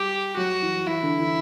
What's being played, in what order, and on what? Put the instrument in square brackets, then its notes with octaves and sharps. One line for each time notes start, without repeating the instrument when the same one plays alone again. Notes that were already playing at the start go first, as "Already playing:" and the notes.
Already playing: [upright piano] G3 [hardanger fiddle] G4
[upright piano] F#3 [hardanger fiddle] F#4
[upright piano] E3
[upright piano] E3 [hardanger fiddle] E4
[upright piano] D3
E3